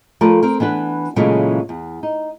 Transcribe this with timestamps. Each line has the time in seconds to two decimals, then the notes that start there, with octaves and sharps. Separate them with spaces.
0.21 F3 A3 A#4 B4 D5
0.43 C4 A#4
0.60 E3 B3 D4 B4
1.16 A#2 C#3 E3 F#3 G#3 A3
1.69 E2
2.03 D#4